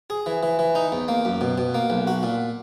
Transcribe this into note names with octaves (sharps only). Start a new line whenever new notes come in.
G#4
E3
E3
E3
D#4
E2
A#3
F#2
B2
B2
A#3
B1
F#4
A#2